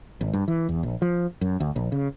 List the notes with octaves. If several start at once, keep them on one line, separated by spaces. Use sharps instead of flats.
G#1
G2
E3
E2
A#1
F3
F#2
D2
A#1
C#3